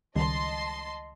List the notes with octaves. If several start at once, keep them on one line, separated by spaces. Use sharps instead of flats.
C#2 D#3 G3 D#5 A5 C6